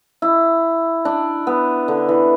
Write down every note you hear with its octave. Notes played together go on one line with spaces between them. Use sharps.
E4
D4
B3
D3
E3